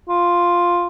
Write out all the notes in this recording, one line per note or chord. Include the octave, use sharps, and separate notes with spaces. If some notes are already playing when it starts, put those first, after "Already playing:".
F4